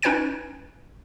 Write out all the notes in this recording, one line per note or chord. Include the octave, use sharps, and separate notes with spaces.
C#4 D#4 B4 G5 G#6 D7